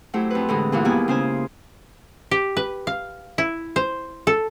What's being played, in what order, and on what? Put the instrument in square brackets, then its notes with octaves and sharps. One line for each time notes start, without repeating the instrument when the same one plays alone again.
[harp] F#3 A3 E4 G4 C5
F2 B4
A2 D3 E3 G#3
G2 A#2 E3 F#4
D#2 G3 A#3 B3 E4 G#5
C#3 C5 G#5
[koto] G4
B4
F5
E4
C5
A4